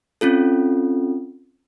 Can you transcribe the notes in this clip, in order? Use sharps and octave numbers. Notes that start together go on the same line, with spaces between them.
C4 C#4 F4 A4